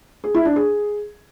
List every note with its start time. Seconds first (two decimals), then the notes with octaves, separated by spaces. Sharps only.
0.24 G#4
0.34 E4
0.45 D4
0.56 G#4